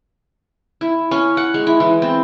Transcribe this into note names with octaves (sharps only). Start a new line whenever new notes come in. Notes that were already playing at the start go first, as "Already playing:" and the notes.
E4
C#4
F#5
G#3
E4
E3
C4